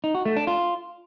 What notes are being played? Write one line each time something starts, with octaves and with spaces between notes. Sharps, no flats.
D#4
F#4
A3
D4
F4